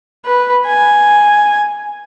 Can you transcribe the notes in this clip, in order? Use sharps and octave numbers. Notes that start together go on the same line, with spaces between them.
B4
G#5